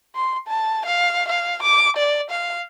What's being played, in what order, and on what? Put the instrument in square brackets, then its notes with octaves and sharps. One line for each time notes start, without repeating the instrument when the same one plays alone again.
[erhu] C6
A5
F5
F5
D6
D5
F5